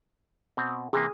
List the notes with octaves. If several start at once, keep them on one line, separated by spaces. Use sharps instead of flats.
B2 C4
C3 E3 A#3 G#4